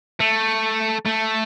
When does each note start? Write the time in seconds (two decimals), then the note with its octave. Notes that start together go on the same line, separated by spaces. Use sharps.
0.20 A3
1.06 A3